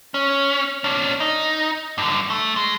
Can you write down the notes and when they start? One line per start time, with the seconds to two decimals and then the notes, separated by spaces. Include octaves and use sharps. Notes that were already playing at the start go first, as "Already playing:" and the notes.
0.14 C#4
0.84 C#4 D4
1.20 D#4
1.98 G2 D3
2.30 A3
2.56 G#3